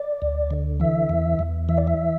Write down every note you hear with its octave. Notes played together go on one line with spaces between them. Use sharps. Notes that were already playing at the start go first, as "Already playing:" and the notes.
Already playing: D5
D2
D3
E3 E5
E2
E2
E3 E5
D5
E5